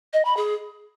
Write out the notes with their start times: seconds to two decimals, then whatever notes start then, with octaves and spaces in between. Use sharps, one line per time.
0.13 D#5
0.25 B5
0.37 G#4